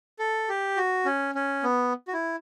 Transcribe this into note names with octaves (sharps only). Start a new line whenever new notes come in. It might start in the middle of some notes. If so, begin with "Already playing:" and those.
A4
G4
F#4
C#4
C#4
B3
F#4
E4